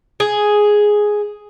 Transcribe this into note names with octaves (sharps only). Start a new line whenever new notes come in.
G#4